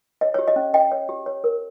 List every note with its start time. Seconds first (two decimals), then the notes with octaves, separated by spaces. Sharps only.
0.21 C#5 D#5
0.34 G4 C#5
0.48 D#5
0.56 C#4
0.74 C#4 D#5 G5
0.92 C#5
1.09 G4
1.26 C#5
1.44 A#4